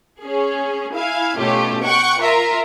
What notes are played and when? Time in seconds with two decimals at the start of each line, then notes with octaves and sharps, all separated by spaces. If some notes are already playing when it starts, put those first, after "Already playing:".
0.21 C#4 G#4
0.94 E4 F5 G#5
1.37 B2 A3 C#4 F4 G4
1.83 F#5 G5 C#6 F#6
2.19 F4 A#4 E5 A#5